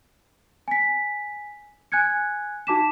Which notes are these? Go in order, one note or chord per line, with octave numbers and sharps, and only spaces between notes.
G#5 B6
G#5 F#6 G#6 C#7
D#4 F#4 A5 D6 B6 E7